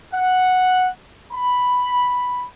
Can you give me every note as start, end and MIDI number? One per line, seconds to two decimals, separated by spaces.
0.13 0.87 78
1.33 2.45 83